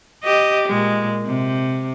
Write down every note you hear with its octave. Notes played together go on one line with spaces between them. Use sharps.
G4 D#5
A#2 G#3
C3